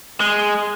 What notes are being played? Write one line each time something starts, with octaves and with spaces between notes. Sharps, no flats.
G#3